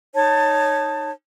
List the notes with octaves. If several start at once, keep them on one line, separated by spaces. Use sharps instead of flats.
D#4 C#5 A5